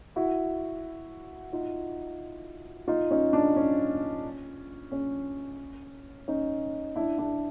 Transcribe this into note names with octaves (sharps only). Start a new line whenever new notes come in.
E4 F#4
D#4 F4
D#4 F4
C#4 D#4
D4
C#4
C#4
C#4 D#4
D4 E4
D4 E4